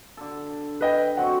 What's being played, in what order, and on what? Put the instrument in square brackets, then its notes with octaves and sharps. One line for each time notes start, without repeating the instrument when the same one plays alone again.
[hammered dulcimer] D3 A4
[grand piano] B4 D#5 G5
[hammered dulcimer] F#3 C4 F#4 [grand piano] F#5